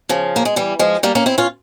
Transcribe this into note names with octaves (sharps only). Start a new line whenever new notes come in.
C#3 F3
A#3
G#3
E3 G3
F3 G#3
G3 A#3
A#3 C#4
C4 E4
C#4 F4